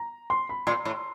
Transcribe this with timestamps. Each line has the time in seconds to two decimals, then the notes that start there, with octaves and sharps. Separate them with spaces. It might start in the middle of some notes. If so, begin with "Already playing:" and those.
Already playing: A#5
0.30 C6
0.49 B5
0.67 A#2 C6
0.85 A2